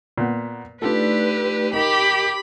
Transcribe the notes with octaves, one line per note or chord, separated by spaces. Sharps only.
A#2 B3
A3 D4 D#4 F4 G4 A4 B4 D5
D#4 G4 A#4 B5